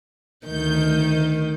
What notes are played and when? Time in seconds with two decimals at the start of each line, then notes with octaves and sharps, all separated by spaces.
0.47 D2 D#3 G6